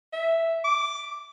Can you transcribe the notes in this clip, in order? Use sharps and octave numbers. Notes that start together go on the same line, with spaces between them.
E5
D6